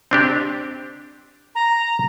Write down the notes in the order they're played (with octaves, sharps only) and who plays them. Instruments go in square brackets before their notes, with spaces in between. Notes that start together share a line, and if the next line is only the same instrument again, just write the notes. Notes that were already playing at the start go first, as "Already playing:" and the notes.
[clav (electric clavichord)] C4 D4 G4
[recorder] A#5